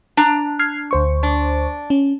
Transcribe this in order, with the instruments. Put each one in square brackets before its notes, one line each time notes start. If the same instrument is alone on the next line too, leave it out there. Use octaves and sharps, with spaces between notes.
[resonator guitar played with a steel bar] D4 A#5
[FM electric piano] F6 G#6 C7
D2 C5 C#6
[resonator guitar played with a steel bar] D4
[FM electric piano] C#4